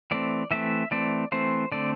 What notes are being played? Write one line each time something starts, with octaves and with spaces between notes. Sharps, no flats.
E3 A3 C4 D5
E3 A3 C4 E5
E3 A3 C4 D5
E3 A3 C4 C5
D3 A3 C4 D5